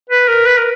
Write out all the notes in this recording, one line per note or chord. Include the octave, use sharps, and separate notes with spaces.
B4
A#4
B4
A#4